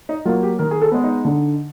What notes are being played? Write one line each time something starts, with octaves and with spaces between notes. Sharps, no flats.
D#4
F#3 A#3 F4
G4
D#3 A#4
G#4
A4
G#3 B3
D#4
D3